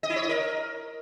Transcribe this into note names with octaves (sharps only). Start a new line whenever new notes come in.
D#5
E4
C#5
D#5
A#4